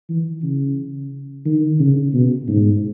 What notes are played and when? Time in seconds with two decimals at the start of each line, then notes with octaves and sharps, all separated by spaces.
0.09 E3
0.43 C#3
1.45 D#3
1.80 C#3
2.13 B2
2.48 G#2